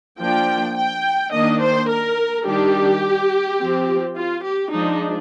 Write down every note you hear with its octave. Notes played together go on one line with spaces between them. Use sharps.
F3 A#3 D4 G5
G5
D#3 A#3 D4 D#5
C5
A#4
D#3 G3 D4 G4
F3 C4
F4
G4
F3 G#3 D4 D#4